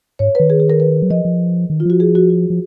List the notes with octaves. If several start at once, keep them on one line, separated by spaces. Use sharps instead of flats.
G#2 C#5
B4
D#3
G#4
G#4
A#4
B4
F#3
F3 D#5
F3
D#3
F4
F3 F#4
G#4
F#4
F#4
F3